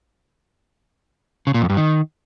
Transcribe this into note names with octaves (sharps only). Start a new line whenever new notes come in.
C#3
A#2
F2
G2
D#3